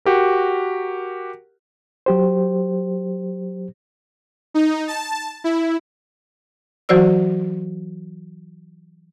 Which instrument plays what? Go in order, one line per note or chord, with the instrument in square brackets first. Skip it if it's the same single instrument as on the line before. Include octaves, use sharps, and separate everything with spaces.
[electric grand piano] F#4 G4 A#4
[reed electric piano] F#3 G4 C5
[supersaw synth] D#4
A5
E4
[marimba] E3 F#3 F#4 C5 D5 E6